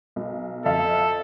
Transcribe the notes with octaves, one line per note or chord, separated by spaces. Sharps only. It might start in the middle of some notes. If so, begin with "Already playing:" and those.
B1
F2 A4 E5 F5